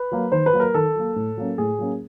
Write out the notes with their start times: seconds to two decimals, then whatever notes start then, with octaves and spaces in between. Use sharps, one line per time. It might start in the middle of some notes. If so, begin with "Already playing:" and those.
Already playing: B4
0.12 F#3 A#3
0.32 D#3 C5
0.46 B4
0.53 F#3 A#3
0.60 A#4
0.74 D#3 A4
0.95 F#3 A#3
1.16 A2
1.37 F#3 A#3 C#4
1.58 A2 G#4
1.79 F#3 A#3 C#4